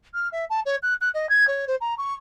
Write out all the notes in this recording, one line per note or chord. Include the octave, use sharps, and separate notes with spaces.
F6
E5
A5
C#5
F#6
F#6
D#5
G#6
C#5
C5
A#5
C#6